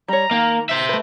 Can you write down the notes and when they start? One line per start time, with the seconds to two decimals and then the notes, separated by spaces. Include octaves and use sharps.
0.08 G3 C#5 A#5
0.31 D#3 A#3
0.69 C5 E5
0.89 A3 B4